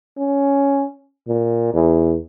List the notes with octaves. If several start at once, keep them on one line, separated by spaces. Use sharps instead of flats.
C#4
A#2
E2